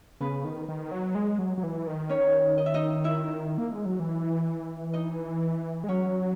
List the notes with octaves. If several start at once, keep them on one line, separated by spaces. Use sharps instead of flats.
C#3 B3 B4
D#3
D#3
F#3
G#3
F#3
F#3
E3
D#3
C#4 C#5
D#5
E5
D#4 D#5
E4 E5
A#3
G#3
F#3
E3
D#4 D#5
G#3
F#3 C#4 C#5